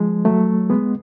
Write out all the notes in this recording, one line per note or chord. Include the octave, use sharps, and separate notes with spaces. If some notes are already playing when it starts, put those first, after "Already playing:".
Already playing: F3 G#3
F#3 A3
G#3 B3